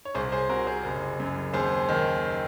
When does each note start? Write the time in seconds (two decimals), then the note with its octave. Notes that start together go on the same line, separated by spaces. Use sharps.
0.05 C#5
0.15 C2 G#4 C5
0.32 G#4 C5
0.49 C3 F#4 A#4
0.67 G#4 C5
0.84 F#1
1.20 F#2
1.53 D#2 G#4 C5
1.89 D#3